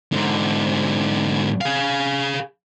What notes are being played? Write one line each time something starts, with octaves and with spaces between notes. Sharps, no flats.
G#2 D3
G#4 F5